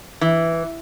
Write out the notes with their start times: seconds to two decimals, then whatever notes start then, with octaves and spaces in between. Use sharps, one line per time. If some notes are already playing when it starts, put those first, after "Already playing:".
0.21 E3